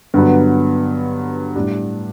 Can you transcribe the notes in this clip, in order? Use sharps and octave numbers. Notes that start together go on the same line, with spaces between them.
G2 D3 F#3 B3
A2 G3 D4 G4